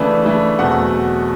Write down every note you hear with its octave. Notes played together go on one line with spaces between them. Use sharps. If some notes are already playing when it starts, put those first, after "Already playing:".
Already playing: C#3 E3 A3 D4
C#3 E3 A3 D4
E2 B2 F#3 A3 C4 F#5